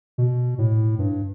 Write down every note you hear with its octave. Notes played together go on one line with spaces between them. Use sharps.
B2
A2
G2